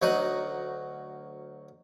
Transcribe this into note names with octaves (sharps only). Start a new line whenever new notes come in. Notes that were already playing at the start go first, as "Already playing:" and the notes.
D2 F#3 D#4 F#5 A#5 D#6